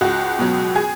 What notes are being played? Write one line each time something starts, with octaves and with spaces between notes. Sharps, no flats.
C#2 F#4
B2 F#3
G#4